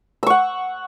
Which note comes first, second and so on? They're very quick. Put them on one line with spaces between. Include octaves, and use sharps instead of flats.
E6 C#6 F#5